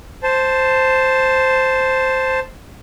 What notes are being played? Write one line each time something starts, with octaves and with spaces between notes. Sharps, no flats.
C5 A5